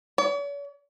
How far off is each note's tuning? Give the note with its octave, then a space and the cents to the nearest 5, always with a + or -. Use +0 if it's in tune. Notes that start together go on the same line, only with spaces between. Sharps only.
C#5 +45